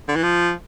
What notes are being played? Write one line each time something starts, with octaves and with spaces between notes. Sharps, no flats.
D3
E3
F3